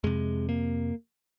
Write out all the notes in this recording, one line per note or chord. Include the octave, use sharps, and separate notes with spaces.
F2 C3 G#3
A#3